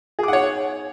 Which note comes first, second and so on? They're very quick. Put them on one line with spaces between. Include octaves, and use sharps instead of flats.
G#4 D6 F#5 C#5